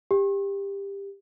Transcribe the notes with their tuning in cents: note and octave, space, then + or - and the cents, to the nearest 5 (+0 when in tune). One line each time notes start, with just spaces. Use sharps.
G4 +20